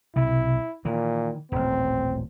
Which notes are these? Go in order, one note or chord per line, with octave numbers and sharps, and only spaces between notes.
B1 C3 E4
A#2 D#3 E3
D#1 A1 C4